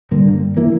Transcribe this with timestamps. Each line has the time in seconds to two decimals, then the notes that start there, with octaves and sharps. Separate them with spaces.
0.11 G2 D3 G3 A#3
0.57 E3 A#3